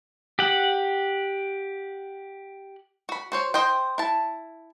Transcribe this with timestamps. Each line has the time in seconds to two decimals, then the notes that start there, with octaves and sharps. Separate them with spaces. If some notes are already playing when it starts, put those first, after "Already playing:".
0.39 G4 F#5
3.09 F#4 B5
3.32 F#4 C5 C#5
3.54 C5 D#5 G5
3.98 E4 A5